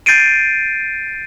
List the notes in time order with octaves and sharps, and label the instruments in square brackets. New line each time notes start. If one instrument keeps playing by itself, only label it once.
[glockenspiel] G6 A6 C7 D7 D#7